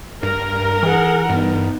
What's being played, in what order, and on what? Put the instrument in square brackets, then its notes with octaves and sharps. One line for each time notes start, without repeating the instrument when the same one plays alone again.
[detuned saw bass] G2 [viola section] A#4
[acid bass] E3 [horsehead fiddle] G#4 F#5
[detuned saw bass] G2 [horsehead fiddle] B3 D#4